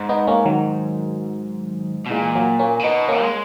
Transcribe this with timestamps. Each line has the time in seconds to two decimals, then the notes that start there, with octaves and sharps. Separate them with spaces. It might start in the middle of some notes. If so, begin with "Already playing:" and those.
Already playing: G#2
0.09 B3 D#4
0.27 A#3 C#4
0.46 D#3 F#3
2.06 B2
2.10 A#2 E3 G#3
2.35 F#3 A#3
2.59 A#3 C#4
2.79 C#3
2.84 B2 B3 D#4
3.09 A#3 C#4
3.21 G#3